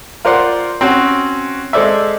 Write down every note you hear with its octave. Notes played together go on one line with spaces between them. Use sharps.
F4 A#4 C5 D5 F#5 C6
C4 C#4 F#4
G#3 A4 C5 D5 E5